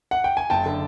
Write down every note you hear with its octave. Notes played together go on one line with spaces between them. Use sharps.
F#5
G5
G#5
F#1 G5 A5
D3